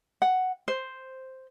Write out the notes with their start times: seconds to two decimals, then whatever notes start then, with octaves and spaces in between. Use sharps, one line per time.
0.22 F#5
0.68 C5